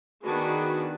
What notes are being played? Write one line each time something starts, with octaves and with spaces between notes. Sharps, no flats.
D#3 B3 D4 F#4 G#4 B4